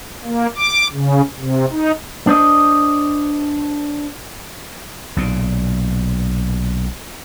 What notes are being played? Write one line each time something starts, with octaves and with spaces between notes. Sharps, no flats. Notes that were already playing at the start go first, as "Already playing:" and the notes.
A#3
D6
C#3
C3
D#4
D4 C5 D#5
B1 A#2